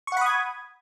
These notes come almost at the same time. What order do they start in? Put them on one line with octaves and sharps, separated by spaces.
C#6 F#5 B5 D#6 G#6